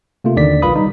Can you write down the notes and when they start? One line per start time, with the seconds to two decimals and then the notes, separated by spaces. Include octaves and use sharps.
0.24 C3 A3 A#3 F4
0.36 D#2 D3 D#3 D5 B6
0.62 B1 F4 B4 F5 B5 D#6
0.76 G3 D#4